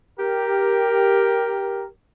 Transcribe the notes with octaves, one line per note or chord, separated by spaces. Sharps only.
G4 A#4